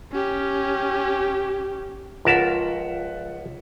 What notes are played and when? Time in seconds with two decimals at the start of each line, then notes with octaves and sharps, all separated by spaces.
0.12 C#4 G4
2.25 C#2 F3 A#4 F#5 A5 B6